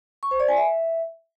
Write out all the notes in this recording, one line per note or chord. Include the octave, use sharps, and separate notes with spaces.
C#6
C5
D5
G#5
E5